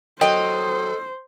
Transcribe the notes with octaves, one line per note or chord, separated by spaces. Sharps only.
F#3 A4 A#4 C5 D#5 G5